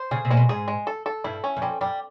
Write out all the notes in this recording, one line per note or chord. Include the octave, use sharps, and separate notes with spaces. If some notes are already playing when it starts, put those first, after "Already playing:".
Already playing: C5
C#3 G#4
C3
A#2 G#3
B2
G#2 G#4
G#3
A4
A4
G2 E4
C#4
F#2
F2 G3
F#2 G3